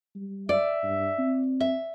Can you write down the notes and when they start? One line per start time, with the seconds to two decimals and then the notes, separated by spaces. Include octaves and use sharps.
0.15 G3
0.49 D5 E5
0.83 G2
1.19 C4
1.60 E5